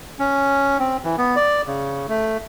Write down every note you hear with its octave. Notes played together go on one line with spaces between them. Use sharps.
C#4
C4
E3
B3
D5
C#3
A3